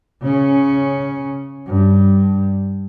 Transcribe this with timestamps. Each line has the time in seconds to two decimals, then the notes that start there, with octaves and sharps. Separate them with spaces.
0.22 C#3 C#4
1.67 G2